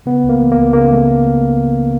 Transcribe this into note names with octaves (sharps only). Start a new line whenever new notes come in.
C#3 B3
C#2
A#3
E3
A#3
C#2
C#3 A#3
A3